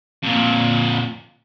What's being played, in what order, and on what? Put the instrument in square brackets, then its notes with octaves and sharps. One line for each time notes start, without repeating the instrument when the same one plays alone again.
[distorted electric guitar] F2 A#2